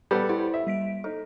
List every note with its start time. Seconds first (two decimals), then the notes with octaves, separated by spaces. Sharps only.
0.11 G3 B3 A4
0.29 E4 C5 F#5
0.54 E5
0.67 G3 B6 D7
1.04 D#4 A4